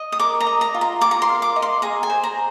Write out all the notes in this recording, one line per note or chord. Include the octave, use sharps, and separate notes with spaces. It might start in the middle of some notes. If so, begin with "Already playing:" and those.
Already playing: D#5
D#6
A#4 D6
A#5
D#5
A#5
F4
A#5
F4 D6
A#5
C6
A#4
D6
D#5
C6
G#4 A#5
G#5
C5
A#5